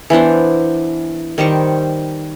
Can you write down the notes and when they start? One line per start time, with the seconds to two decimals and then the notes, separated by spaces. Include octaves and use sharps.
0.10 E3 B3 D4 C5
1.38 D#3 G3 C5 C#6